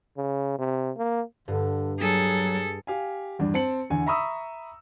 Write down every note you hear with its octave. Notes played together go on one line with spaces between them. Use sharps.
C#3
C3
A#3
G2 D3
F#3 G#4 A4
G4 F5 G#5
E2 G2 D4
C4 A5 C#7 F#7
E2 D3 G#5
E5 A#5 B5 C#6 D#6 E6